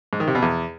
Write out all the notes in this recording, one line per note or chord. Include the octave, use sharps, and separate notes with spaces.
G#2
D#3
C3
B2
E2